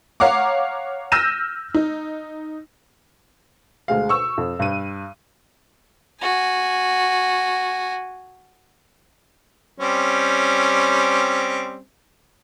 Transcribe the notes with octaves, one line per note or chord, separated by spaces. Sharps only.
C#5 F5 F#5 A#5 D6
E6 F6 G6 A#6 D#7 E7
D#4
D2 G#3 F5
C#6 E6
F2
G2 D#7
F#4 G#5
G3 C4 C#4